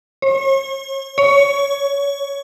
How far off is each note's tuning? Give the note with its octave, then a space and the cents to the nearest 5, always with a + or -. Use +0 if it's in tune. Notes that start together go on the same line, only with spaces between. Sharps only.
C#5 -40
C#5 +15